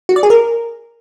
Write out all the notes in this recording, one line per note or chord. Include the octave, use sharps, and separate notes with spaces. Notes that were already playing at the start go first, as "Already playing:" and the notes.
F#4
D5
G#4
A#4